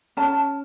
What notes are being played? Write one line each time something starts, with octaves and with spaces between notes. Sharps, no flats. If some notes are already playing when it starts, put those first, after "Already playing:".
C#4 A5